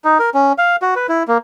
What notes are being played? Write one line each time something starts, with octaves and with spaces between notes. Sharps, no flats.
D#4
A#4
C#4
F5
F#4
B4
E4
A#3